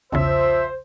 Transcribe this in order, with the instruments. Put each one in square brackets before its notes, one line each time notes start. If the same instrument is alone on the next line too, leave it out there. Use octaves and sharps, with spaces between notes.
[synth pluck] B1 E2 C#3 [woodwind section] F3 E5 [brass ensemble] C5